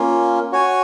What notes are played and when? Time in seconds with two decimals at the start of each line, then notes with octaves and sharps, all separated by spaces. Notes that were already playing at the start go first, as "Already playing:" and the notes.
Already playing: A#3 C#4 F4
0.52 F#4 C#5 G#5